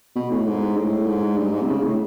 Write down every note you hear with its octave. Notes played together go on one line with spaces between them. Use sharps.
B2
A2
G#2
A2
G#2
G2
G#2
C3
C#3
A2